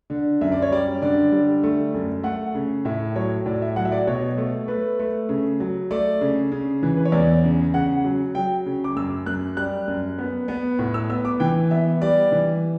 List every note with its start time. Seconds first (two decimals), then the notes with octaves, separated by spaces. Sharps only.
0.10 D3
0.41 F#2 E5
0.52 D5
0.62 C#5
0.71 G3 D5
1.02 D3 D5
1.32 G3
1.63 A3
1.94 F#2
2.23 A3 F#5
2.55 C#3
2.85 A2 E5
3.16 F#3 C#5
3.46 A2 D5
3.62 E5
3.76 F#3 F#5
3.85 E5
3.92 D5
4.07 B2 C#5
4.37 A3
4.68 A3 B4
4.99 A3
5.29 C#3
5.60 F#3
5.91 A3 D5
6.21 C#3
6.52 C#3
6.83 E3
6.97 B4
7.05 C#5
7.12 E2 D5
7.44 C#3
7.74 C#3 F#5
8.05 F#3
8.35 F#3 G5
8.66 C#3
8.84 D6
8.96 F#2 E6
9.26 F#2 F#6
9.57 G3 F#6
9.88 F#2
10.18 B3
10.48 B3
10.79 A2
10.94 E6
11.10 B3 E6
11.25 D6
11.40 E3 G5
11.71 B3 E5
12.02 G3 D5
12.32 E3